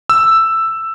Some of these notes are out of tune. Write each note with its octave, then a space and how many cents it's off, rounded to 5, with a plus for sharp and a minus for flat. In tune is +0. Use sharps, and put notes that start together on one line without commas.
E6 +5